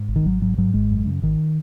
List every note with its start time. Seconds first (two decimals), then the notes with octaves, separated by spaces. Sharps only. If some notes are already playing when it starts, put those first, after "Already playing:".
Already playing: G#2
0.09 G#1
0.16 D#3
0.25 G#1 F#3
0.42 G#2 F#3
0.57 G#2 F#3
0.74 G#1 G#3
0.91 F#2
1.06 C#3
1.22 G#1 D#3